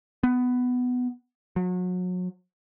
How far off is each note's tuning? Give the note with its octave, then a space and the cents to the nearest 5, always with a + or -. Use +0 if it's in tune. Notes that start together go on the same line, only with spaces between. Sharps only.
B3 +10
F#3 -35